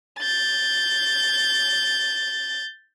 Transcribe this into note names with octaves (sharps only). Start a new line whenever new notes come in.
G6 A6